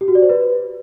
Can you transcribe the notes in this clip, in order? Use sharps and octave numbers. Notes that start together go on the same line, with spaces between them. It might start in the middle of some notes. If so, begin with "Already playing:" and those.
G4
F#4
D5
C5
B4